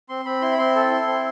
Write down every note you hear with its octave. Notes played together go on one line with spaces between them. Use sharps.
C4 C6
C4 B5
E4 C6
B5
C4 C6
A4
E4
C4